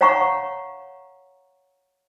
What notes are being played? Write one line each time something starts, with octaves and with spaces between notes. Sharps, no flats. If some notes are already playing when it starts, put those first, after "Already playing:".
C#5 F5 F#5 A#5 C#6